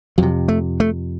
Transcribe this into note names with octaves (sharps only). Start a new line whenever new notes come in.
F2 C3 F#3
A3
A3